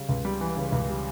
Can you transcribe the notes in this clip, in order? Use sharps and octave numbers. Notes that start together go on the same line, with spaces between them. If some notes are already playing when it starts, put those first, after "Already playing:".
Already playing: C#3 G3
C#2
G3
E3
C#3
C#2
G3